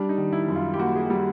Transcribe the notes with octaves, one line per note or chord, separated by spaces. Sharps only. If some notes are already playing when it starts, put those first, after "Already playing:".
Already playing: G3 D4
D#4
D#3
E4
F#2
F4
G4
A#3 F#4
G#4
G4
G3